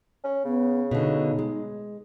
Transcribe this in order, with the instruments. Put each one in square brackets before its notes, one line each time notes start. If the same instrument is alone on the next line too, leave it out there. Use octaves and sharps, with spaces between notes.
[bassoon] C#4
[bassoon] C#3 [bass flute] B3
[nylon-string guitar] B2 D3 [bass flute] D#4
[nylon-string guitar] G#3